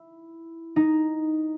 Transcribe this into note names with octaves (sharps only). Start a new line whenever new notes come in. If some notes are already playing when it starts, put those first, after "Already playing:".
Already playing: E4
D#4